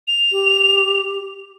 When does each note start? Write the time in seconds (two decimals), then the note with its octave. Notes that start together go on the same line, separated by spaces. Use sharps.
0.08 F7
0.32 G4